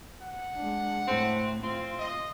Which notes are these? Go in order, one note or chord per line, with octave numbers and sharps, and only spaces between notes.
F#5
G#3 D4
A2 A3 C4
C4 F4
D#5